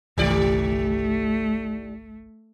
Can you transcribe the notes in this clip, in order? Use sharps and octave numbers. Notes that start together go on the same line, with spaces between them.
G1 C2 D#3 F3 A3 G4 D5